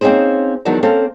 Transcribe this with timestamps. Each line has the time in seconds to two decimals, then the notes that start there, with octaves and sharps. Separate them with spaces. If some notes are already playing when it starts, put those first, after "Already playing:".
0.01 A#3 C4 C#4 D#4 G#4 C5
0.65 E2 D#3 F#3 D#4 D5 A5
0.83 A#3 C4 C#4 A4 F5